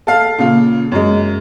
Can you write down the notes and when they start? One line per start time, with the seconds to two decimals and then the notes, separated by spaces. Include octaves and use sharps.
0.07 A4 F5
0.38 A#2 C#3 F4
0.92 F#2 G#3